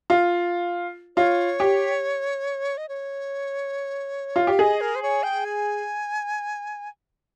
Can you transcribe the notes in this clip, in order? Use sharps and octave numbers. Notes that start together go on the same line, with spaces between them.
F4
F4 C#5
G4
D#5
C#5
F4
G4 F5
G#4 D#5
A#4
C5
C#5
G5
G#5